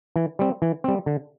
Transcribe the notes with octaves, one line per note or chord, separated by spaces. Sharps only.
E3
G3 C4
E3
G3 C4
D3